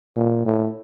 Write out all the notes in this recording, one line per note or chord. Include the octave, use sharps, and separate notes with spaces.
A#2
A2